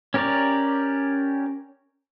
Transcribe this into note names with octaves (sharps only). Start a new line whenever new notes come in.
C#4 G4 A#4 C#5 D5